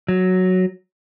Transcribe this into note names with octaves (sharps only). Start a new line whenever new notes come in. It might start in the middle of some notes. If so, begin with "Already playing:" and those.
F#3